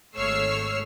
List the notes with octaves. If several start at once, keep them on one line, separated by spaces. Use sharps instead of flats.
G#1 A3 C#5 E6 F6 C7